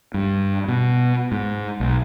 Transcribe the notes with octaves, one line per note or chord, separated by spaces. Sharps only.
G2
B2
G#2
B1